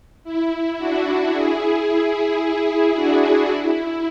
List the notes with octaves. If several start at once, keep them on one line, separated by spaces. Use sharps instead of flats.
E4
D4 F#4
E4 G#4
E4 G#4
E4 G#4
D4 F#4
E4